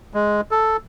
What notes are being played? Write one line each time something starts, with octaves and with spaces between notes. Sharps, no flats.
G#3
A4